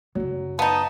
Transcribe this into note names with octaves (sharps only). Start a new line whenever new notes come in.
F#2 C#3 F#3
B3 D#4 F5 A5